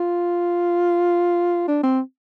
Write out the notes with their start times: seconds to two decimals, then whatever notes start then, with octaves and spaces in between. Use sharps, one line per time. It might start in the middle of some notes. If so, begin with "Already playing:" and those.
Already playing: F4
1.68 D4
1.83 C4